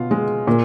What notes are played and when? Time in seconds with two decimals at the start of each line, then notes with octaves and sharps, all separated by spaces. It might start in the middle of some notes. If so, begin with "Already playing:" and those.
Already playing: B2 F4
0.11 G#3
0.47 A#2